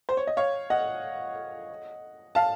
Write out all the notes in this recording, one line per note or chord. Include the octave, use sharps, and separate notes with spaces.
C5
C#5
D#5
C#5 F5
D#5 F#5
F5 A5